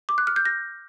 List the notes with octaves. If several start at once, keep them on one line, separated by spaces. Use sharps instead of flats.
D6
F#6
F6
G6
A#6